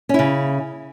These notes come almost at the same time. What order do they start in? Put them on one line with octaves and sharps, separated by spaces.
C#4 E4 C#3